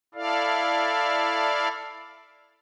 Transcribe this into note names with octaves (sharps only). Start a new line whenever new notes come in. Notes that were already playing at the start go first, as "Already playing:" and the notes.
E4 A4 D5 F5